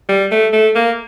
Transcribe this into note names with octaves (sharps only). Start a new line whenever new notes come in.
G3
A3
A3
A#3